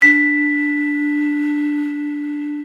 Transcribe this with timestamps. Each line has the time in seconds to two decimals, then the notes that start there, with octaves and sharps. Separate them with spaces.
0.02 D4 B6